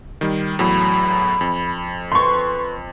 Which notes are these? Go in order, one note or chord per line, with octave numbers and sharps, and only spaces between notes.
D#3 G3
E2 A2 F#3 B5
F2
B4 C6 C#6